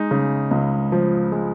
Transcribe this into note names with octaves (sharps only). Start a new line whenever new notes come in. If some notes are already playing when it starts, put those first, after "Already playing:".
Already playing: G#3 D#4
C#3
C#2
F3
G#3